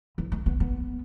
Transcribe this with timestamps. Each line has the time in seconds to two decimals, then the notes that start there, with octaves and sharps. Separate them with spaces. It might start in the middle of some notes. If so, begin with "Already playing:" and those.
0.18 E3
0.32 A3
0.46 B3
0.60 B3